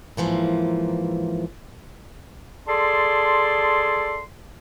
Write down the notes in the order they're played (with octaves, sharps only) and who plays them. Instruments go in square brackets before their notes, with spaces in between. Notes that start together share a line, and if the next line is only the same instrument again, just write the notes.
[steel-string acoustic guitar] G#2 E3 F3 A#3
[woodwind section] G#4 A4 D5 A5 C6